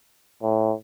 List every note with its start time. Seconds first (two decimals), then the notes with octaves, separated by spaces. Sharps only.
0.43 A2